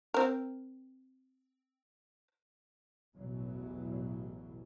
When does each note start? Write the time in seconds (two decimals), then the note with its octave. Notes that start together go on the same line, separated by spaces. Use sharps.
0.14 C4 A#4
3.16 A1 E2 B2 E3 F#3